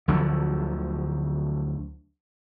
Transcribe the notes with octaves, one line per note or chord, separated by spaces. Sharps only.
D2 D3 F3 F#3